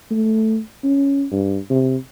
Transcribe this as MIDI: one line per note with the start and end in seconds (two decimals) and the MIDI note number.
0.11 0.60 57
0.84 1.26 61
1.32 1.58 43
1.70 1.97 48